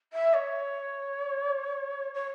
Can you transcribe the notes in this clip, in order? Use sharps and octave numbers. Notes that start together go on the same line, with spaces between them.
E5
C#5
C#5